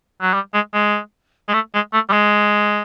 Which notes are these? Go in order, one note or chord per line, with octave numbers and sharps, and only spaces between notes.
F#3
G3
G#3
G#3
G#3
A3
G#3
A3
G3
G#3